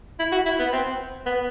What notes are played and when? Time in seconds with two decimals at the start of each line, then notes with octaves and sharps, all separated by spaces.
0.19 E4
0.32 F#4
0.46 E4
0.59 B3
0.72 C4
1.26 B3